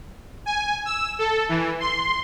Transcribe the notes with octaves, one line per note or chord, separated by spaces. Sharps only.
G#5
E6
A4
E3
C6